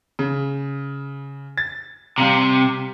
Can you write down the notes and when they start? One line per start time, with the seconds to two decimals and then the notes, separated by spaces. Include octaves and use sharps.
0.19 C#3
1.58 A6
2.18 C3 G3 F5 A#5